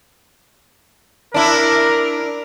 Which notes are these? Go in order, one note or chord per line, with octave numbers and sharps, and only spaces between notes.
D4 E4 A#4